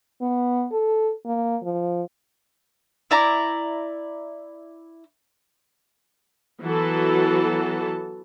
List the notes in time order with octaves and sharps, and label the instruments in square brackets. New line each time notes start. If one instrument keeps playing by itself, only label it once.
[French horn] B3
A4
A#3
F3
[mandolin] E4 D5 A#5
[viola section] E3 F#3 B3 F#4 A4 A5